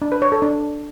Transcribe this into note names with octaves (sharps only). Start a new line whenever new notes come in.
D4
B4
C#5
A4
D4